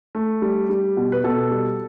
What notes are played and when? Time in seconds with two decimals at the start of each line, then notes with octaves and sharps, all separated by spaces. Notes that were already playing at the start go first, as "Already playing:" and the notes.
0.15 A3
0.42 G3
0.70 G3
0.97 B2
1.12 B4
1.24 B2 A4
1.51 G3